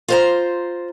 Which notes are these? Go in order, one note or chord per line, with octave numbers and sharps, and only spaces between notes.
F4 C5 A#5